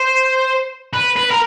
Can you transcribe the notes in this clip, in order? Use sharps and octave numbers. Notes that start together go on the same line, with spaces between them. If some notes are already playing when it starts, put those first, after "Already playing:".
Already playing: C5
B4
B4
A#4